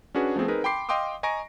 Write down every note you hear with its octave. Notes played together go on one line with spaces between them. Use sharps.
C#4 D4 F#4 G#4 B4
F3 A3 B3 C4 G#4
C4 D#4 G#4 A#4 B4
G5 B5 C6 D6 C7
D#5 F5 G5 C6 D6 D#6
D#5 G#5 A#5 C#6 A#6 D7